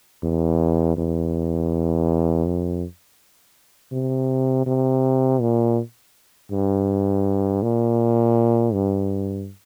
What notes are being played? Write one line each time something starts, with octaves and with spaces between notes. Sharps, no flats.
E2
E2
F2
C3
C3
A#2
G2
A#2
G2